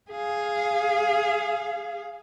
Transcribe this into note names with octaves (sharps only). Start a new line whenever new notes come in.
G#4 F5